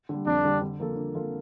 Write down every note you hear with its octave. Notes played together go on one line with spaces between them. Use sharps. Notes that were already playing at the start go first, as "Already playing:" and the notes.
D3 G3
F2 D4
D3 G3
D3
F3 A#3 F4 A4
D3
F3 A#3 F4 A4